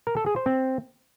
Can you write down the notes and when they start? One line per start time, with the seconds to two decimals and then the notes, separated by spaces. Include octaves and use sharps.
0.07 A#4
0.17 A4
0.26 G#4
0.36 C5
0.46 C4